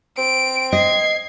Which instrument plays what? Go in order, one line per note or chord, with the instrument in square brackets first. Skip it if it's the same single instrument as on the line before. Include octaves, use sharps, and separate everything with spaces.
[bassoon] C4 [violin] D7
[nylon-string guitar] D#5 [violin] G#6 C7